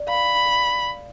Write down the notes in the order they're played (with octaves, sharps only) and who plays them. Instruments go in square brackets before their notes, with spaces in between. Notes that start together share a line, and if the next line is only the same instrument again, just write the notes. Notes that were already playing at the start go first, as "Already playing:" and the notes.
Already playing: [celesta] D5
[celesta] F5 [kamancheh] B5